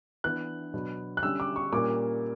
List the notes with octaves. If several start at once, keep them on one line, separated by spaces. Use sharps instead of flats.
E3 B3 D4 F#6
B2 F#3 B3 D4
F#6
D3 G3 C#4 E6
D6
C#6
A#2 G3 A#3 C#4 D6